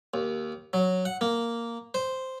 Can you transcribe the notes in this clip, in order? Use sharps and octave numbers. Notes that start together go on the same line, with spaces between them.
D#2
F#3
F#5
A#3
C5